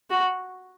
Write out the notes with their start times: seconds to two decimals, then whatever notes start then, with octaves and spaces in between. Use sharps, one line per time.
0.10 F#4